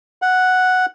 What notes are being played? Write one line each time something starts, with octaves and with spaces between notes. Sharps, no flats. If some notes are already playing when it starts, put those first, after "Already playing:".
F#5